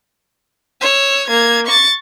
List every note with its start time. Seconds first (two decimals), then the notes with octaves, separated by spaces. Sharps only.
0.81 C#5 E6
1.27 A#3 G#6
1.67 C#6 A6